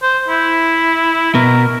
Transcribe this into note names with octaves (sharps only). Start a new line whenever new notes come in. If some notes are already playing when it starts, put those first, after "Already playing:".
C5
E4
B2 A#4